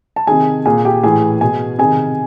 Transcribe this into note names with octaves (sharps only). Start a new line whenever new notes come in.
A5
C3 D#3 G#4 G#5
A#2 G#4 G#5
G4 G5
A2 E3 G#4 G#5
B2 G#4 G#5
C3 D#3 G#4 G#5